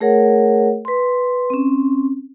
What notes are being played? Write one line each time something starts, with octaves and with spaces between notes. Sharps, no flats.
A3 G#4 A#4 C#5 F#5
B4 C6
C4 C#4